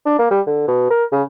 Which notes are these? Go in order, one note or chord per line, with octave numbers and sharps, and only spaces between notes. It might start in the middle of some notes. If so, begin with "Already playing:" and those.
D4
A#3
G3
D3
B2
A#4
C#3